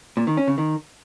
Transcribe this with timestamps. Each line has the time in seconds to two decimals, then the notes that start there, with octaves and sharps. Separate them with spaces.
0.17 A#2
0.27 D#3
0.37 C#4
0.48 C#3
0.58 D#3